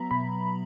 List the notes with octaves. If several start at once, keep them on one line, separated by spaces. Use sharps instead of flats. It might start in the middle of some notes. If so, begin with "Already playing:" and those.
Already playing: F#3 B3 E5 A#5 B5
B2 B5